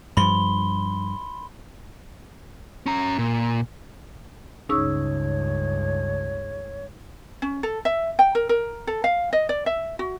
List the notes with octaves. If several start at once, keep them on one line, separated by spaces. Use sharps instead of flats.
G2 F3 B5 C6 G7
C#4 A#5
A#2
C#2 G2 C#3 D#4 C#5 C#6 E6
C#4
A4
E5
G5
A#4
A#4
A4
F5
D#5
D5
E5
F#4